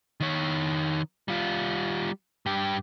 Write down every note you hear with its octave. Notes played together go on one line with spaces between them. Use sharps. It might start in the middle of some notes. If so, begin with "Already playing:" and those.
D#3 C#5
G3 F4
G2 G4